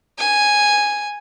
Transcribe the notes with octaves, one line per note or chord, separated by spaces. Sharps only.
G#5